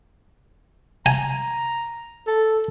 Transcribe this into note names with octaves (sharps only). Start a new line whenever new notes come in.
G#5 A#5
A4